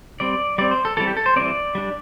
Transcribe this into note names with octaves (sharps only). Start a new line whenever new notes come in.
G3 C4 D5
G3 C4 D5
C5
A4
E3 G3 C4 A4
G4
A4
C5
E3 G3 C4 D5
G3 D4